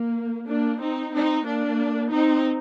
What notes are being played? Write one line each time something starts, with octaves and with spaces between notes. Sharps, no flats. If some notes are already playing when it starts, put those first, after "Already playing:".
Already playing: A#3
A#3 D4
C4 D#4
C4 D#4
A#3 D4
C4 D#4